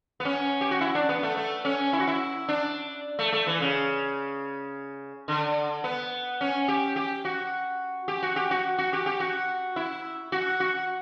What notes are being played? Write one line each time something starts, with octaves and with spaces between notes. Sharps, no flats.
B3
C#4
G4
F#4
E4
D4
B3
A3
A3
C#4
E4
F#4
E4
D4
A3
A3
E3
C#3
D3
B3
C#4
G4
G4
F#4
G4
F#4
G4
F#4
F#4
G4
G4
F#4
E4
F#4
F#4